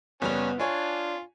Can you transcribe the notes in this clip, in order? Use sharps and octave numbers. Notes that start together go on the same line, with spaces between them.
F#1 G3 B3 C#4 F7
D4 F4 C#5 G#5